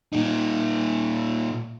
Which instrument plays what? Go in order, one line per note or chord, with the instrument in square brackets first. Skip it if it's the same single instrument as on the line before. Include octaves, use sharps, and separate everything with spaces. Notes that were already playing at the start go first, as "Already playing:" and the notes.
[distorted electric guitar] A#2 D#4